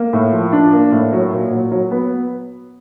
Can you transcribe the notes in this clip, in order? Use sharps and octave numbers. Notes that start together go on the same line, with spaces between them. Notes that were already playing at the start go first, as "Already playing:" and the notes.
Already playing: A#3
A2
F3
D4
A#3
A2
F#3
A#2
F#3
F#3
B3